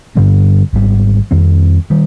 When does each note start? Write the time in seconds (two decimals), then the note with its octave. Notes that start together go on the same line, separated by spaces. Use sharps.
0.15 G2 D3 G3 C4
0.73 G#1 G#2 G3
1.31 F2 D#3 G3 C4
1.90 D#3 G3